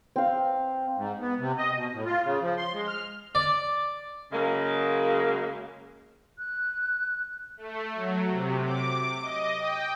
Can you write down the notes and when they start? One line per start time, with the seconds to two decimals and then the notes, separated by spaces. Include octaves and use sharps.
0.16 C4 F5
0.97 G#2
1.20 B3
1.39 C3
1.58 D#5
1.76 B2
1.93 A2
2.06 F4
2.23 C#3
2.42 F3
2.58 C6
2.73 G#3
2.88 F6
3.35 D5
4.32 C#3 F#3 G#3 A#3
6.38 F#6
7.57 A3
7.95 F#3
8.30 C3
8.64 D6
9.21 D#5
9.60 G5